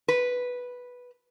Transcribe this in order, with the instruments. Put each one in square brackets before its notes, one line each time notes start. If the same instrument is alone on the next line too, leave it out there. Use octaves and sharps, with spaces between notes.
[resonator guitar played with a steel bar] B4